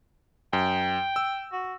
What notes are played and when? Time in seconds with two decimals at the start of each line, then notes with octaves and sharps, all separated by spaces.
0.53 F#2 G5
1.16 E6
1.52 F#4